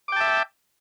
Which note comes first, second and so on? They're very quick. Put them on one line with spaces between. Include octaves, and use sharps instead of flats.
D6 G5 A5 E5